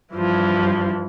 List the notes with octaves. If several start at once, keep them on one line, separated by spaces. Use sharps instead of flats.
G2 E3 F3